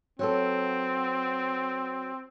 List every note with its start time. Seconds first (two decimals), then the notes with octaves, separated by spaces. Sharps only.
0.19 F#3 B3 C4 A4